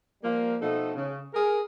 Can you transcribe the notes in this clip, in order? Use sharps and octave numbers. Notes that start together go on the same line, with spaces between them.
F3 G3 A#3
B2 F3 A3 D#4 A4
C#3
G#4 A#4